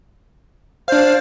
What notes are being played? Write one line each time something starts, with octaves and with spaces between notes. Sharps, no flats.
D4 C5 F5